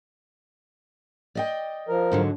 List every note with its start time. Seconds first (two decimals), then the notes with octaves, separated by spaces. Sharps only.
1.35 D5 D#5 G5
1.88 F3 A#4
2.12 G#2 D3 F#3